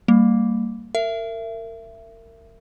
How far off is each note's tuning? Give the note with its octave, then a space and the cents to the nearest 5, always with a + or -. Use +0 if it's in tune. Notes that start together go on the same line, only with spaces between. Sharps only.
G3 +0 A#3 -20
A#4 -30 E5 +25